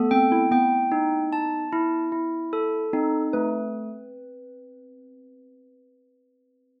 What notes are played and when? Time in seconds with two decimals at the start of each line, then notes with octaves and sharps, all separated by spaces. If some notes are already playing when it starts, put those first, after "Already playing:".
Already playing: A3 B3 A4
0.11 C4 G5
0.32 E4
0.51 B3 G5
0.92 D#4
1.33 A5
1.73 E4
2.12 E4
2.53 A4
2.93 C4 D#4
3.33 A3 B4